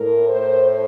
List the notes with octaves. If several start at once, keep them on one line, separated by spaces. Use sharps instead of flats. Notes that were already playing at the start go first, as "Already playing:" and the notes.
Already playing: A2 A#4
C5